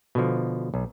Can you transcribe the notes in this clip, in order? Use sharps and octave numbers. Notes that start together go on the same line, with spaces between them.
B2 D3 F3
B1